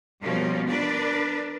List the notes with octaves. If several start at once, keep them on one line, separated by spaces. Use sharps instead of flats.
B2 F3 G3 A#3 C#4
D4 A#4 B4 D5